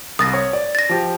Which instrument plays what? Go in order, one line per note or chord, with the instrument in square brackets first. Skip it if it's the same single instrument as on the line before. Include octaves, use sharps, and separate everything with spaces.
[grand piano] C2 [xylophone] D#6 A6 A#6
[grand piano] C#5
D5
[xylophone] A6 A#6
[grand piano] F3 G4